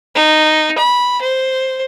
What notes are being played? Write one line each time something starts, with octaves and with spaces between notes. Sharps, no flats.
D#4
B5
C5